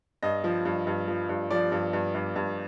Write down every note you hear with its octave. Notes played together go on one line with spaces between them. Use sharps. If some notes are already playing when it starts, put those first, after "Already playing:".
G2 D#5
F3
G2
G2
F3
G2
F3 D5
G2
G2
G2
G2